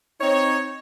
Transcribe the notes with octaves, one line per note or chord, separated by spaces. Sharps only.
C4 D#4 C#5